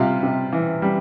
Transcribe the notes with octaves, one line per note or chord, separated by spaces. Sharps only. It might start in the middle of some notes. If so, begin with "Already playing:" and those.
Already playing: C3 G3 F4 F5
C3
E3
G3